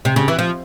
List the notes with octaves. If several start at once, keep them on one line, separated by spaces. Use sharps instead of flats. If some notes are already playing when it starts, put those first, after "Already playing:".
C3
C#3
E3
F3